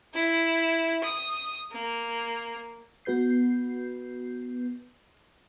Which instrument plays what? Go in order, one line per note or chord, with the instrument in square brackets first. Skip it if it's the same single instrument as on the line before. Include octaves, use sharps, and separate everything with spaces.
[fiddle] E4
D#6
A#3
[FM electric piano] B3 F#4 B4 G6 C7